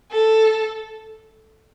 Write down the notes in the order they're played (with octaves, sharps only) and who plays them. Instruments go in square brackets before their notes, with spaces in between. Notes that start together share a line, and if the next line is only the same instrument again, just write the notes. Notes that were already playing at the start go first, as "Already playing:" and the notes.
[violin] A4